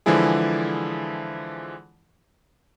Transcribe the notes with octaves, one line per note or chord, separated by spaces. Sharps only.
D3 E3 F3 G#3 E4 G#4